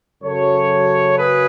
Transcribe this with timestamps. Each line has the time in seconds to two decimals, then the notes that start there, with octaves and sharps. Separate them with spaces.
0.22 F#2 C#3 F#3 A4 C#5
1.16 G#4 B4